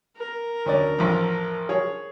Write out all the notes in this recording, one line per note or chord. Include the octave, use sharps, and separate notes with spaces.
A#4
D2 C#4 D5
A1 F2
G#4 C#5